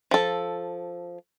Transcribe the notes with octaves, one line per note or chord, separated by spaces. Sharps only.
F3 A4